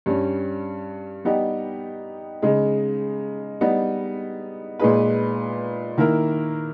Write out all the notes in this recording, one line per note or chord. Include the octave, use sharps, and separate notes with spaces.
G2 G3 C#4
G3 B3 D#4 G4
C#3 G#3 D#4
G3 B3 D#4
A#2 G#3 D#4 G#4 B4
D#3 A#3 E4 A#4